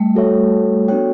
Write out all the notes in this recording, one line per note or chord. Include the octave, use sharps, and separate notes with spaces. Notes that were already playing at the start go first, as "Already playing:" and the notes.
Already playing: G3 A3
F#4 A4 C#5 E5
B3 D4 F#4 A4 C#5 G5